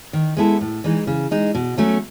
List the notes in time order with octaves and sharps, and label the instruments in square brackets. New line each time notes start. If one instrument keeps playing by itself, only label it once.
[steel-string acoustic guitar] D#3
G#3 B3 E4 A4
A2
E3 G#3 D#4
C#3
G#3 D#4
B2
F#3 A3 C#4